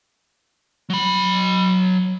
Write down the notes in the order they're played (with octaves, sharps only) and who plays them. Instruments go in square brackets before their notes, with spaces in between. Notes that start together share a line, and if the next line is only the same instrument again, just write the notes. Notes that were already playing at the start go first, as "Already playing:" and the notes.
[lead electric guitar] F#3 B5